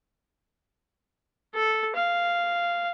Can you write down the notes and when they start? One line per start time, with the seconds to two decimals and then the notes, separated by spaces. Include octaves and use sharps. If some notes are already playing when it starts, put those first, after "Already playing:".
1.55 A4
1.95 F5